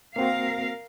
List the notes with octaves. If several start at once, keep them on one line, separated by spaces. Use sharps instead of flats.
A#3 C4 F#4 A#4 F5